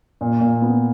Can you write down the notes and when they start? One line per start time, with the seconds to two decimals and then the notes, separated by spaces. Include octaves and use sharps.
0.21 A#2
0.40 A#2
0.62 B3